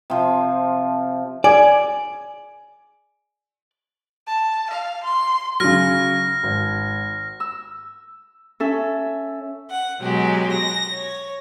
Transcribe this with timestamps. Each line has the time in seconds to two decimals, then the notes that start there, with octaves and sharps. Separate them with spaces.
0.10 C3 F3
1.44 D5 G#5
4.27 A5
4.70 F5
5.04 C6
5.60 C#3 F#3 F6 A#6
6.43 G#1
7.40 E6
8.60 C#4 A4 E5
9.71 F#5
10.01 B2 F#3 G#3 G4
10.52 A#6
10.93 C#5